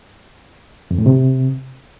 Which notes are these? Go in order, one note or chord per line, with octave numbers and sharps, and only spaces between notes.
F2
A2
C3